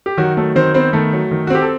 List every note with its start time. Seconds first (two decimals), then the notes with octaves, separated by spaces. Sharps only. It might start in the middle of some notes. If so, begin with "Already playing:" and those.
0.06 G4
0.17 D#3 F#3 F#4
0.37 F#3 A3 A4
0.55 D#3 C4 C5
0.74 B3 C4 C5
0.93 D#3 A3 A4
1.13 F#3
1.31 D#3
1.47 F#4
1.50 C4 G4
1.62 A4